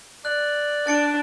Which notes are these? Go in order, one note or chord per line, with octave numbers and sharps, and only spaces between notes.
D5 F#6
D4 A6 C#7 D7